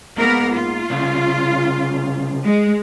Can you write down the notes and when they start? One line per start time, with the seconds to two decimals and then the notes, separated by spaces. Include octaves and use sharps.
0.18 G#2 A#3 B3 A#4
0.54 F4
0.90 C2 C#3
2.45 G#3